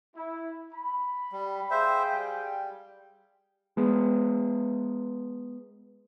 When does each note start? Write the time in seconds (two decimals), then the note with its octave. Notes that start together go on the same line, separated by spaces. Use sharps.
0.15 E4
0.74 B5
1.32 G3
1.71 G#4 C5 E5 F5 G5
2.12 G3
3.77 G#3 B3